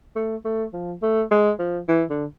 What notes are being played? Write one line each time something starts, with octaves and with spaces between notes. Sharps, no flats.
A3
A3
F3
A3
G#3
F3
E3
D3